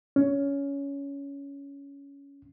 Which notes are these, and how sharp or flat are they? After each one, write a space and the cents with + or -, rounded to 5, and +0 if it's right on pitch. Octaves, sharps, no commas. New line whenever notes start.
C#4 +15